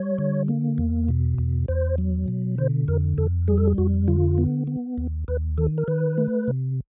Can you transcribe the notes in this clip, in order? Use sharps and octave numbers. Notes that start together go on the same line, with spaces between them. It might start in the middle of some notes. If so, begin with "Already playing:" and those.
Already playing: G3 C#5
D3
A#3
E2
B2
E2
E2 C5
F#3
B2
D3 C5
F2 A#4
F2 A4
G3 G#4
A4
G#4
F2 F#4
D3 F4
B3
B3
D#2
D#2 B4
D#3 A4
A#4
D#3 B4
A3
C3